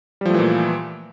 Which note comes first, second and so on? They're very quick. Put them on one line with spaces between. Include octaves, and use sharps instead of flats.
G3 F3 A3 E3 A#2